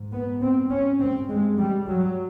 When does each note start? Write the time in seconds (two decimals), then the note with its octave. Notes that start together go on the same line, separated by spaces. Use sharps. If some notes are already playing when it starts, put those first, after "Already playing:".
Already playing: G#2
0.12 B3
0.41 C4
0.70 C#4
1.00 G2 C4
1.29 G#3
1.58 G3
1.87 F#3